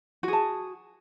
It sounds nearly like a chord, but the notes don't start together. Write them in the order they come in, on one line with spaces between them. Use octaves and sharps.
F#4 G#4 A5